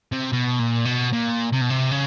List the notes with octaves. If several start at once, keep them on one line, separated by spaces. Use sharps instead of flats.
C3
B2
A#2
B2
A#2
C3
B2
C3
C#3